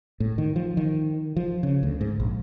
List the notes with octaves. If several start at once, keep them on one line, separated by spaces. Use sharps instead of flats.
A2
D#3
F3
D#3
F3
C#3
D2
G#2
A#1